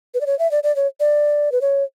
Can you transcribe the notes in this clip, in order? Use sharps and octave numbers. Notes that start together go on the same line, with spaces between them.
B4
D5
C#5
E5
D5
D5
C#5
D5
B4
C#5